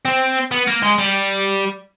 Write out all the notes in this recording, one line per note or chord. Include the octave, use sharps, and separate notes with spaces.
C4
B3
A#3
G#3
G3